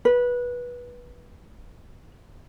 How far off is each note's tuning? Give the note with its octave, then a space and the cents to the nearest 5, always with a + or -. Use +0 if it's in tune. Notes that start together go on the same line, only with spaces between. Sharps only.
B4 -20